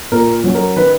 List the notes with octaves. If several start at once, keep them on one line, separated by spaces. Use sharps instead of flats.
A#2 A#4
F#3 C#4
A#4
D#3 B4